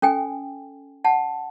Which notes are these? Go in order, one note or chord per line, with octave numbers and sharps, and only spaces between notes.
C#4 A4 G5 G#5
F#5 A5